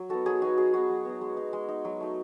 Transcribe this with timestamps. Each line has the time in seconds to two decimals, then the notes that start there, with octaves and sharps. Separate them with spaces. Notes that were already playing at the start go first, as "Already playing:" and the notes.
Already playing: F#3
0.09 B3 D#4 F#4 A4
0.25 F#3 G#4
0.42 B3 D#4 F#4
0.57 F#3 G#4
0.73 B3 D#4 F#4
0.89 F#3
1.05 B3 D#4
1.21 G#3
1.37 D#4
1.53 G#3
1.68 D#4
1.85 F#3
2.00 A3 D#4